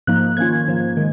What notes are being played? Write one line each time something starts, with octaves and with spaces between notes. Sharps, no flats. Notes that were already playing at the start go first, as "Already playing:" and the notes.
G#2 F3 A#3 D#4 F#6
D#3 A#3 C#4 F4 G#6
G#2 F3 A#3
D#3 G#3